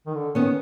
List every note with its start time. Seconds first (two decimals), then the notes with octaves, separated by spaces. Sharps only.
0.07 D#3
0.15 D3
0.35 D#3 B3 C#4